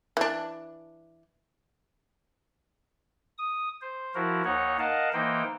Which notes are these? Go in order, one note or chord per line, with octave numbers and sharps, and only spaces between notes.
E3 D4
D#6
C5
F3 E4 F#4 A#4
D#2 D#4 C#5 F#5
A#4 D#5 F5 F#5 A5
E3 A#3 D#4 C5 G5